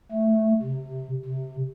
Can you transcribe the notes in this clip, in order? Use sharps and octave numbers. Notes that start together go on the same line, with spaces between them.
A3
C3
C3